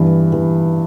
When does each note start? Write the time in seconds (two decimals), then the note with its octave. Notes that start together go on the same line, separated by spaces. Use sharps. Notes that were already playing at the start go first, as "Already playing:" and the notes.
Already playing: G2 E3
0.32 E3